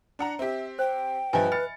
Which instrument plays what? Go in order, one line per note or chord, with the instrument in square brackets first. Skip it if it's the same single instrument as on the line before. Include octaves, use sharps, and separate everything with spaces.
[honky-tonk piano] D4 F#5 A#5
[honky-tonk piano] C4 G4 [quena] E5
[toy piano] C5 [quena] G5
[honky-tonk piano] G2 F3 [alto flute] B4 [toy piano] D#5 E5 G#5
[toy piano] B5 [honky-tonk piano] F6 A6 C#7